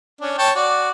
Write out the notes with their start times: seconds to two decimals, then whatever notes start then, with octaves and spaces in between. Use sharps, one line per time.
0.21 C#4 D4
0.38 C#5 G5 A5
0.56 F#4 D5